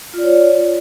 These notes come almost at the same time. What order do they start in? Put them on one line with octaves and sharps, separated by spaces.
F4 D5 C#5